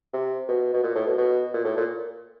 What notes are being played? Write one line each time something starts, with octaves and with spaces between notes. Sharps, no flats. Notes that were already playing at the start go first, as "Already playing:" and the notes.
C3
B2
B2
A#2
A2
B2
B2
A#2
A2
A#2